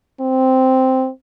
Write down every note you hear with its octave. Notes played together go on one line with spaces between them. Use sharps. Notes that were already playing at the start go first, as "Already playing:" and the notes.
C4